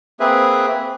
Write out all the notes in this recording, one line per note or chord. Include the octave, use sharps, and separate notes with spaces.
A#3 C4 G#4 B4 E5